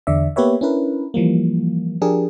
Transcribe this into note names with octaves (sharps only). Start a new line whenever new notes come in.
E2 D3 D5 E5
A#3 B3 G4 B4 C#5 E5
C#4 D4 E4 A#4 B4
E3 F3 G3 A#3
F3 D4 G4 G#4 A#4